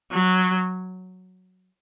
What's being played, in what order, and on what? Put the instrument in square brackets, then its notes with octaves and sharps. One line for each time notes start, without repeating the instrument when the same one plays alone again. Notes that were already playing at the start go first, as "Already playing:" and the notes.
[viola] F#3